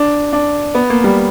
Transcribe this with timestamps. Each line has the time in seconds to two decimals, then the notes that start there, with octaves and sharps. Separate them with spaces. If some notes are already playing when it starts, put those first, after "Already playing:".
Already playing: D4
0.33 D4
0.75 B3
0.90 A#3
1.04 G3